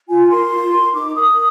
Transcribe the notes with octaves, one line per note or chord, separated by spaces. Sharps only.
F4 G#5
A#4 C6
F4
A#4
D#4 D6
A#4 D#6